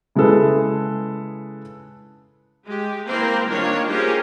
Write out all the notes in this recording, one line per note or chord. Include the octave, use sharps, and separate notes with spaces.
C#3 G#3 E4 G#4 A4 B4
G#3 G4
E3 A#3 C4 A#4 C5
D#3 G3 A#3 D4 F4 C#5
C#4 F4 G4 G#4 A#4 C5